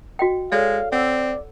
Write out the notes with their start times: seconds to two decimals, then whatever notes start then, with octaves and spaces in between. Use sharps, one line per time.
0.19 F#4 D#5 G5
0.52 G#3 A4 C#5 D5 F5
0.92 C4 D5 F#5 E6